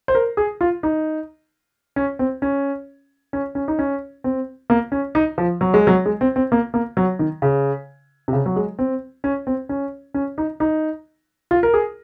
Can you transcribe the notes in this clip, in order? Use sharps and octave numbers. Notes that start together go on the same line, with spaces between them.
C5
A#4
G#4
F4
D#4
C#4
C4
C#4
C#4
C#4
D#4
C#4
C4
A#3
C#4
D#4
F3
F#3
G#3
F#3
G#3
C4
C4
A#3
A#3
F#3
D#3
C#3
C3
C#3
F#3
G#3
C4
C#4
C4
C#4
C#4
D#4
D#4
F4
A#4
G#4